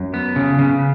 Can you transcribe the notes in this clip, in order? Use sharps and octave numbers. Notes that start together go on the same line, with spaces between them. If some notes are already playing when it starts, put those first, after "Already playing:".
Already playing: F#2
B3
C#3
C#3